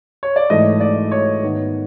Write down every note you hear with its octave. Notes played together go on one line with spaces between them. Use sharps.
C#5
D5
G#2 E3 A3 D#5
D5
C#5
G#2 D#3 G#3 B3